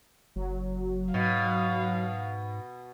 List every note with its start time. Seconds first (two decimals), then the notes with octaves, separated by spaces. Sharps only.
0.36 F#1 F#3
1.14 G#2 B2 F5